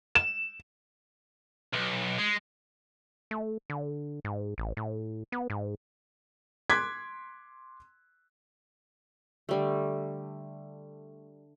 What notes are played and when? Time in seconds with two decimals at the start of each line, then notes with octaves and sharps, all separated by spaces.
0.15 E7
1.73 B1
2.18 G#3
3.31 A3
3.70 D3
4.25 G#2
4.58 A1
4.77 A2
5.32 B3
5.50 G#2
6.70 C6 D6 F#6 G#6 B6
9.49 D3 G3 A3